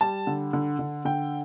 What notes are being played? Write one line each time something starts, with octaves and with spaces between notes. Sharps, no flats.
G3 A5
D3
D3
D3
D3 G5